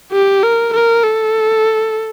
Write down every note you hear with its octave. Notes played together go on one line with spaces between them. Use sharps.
G4
A#4
A#4
A4